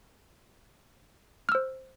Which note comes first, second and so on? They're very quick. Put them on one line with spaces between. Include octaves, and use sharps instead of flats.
F6 E6 C5